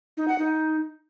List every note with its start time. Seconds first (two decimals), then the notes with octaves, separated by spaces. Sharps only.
0.17 D#4
0.28 F#5
0.39 D#4